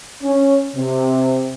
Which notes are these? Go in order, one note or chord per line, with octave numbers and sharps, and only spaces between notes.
C#4
C3